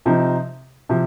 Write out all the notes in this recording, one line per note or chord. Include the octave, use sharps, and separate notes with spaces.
C3 F3 C4 D#4
C3 F3